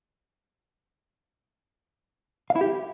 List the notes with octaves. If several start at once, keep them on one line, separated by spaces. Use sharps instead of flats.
F5
E4
G4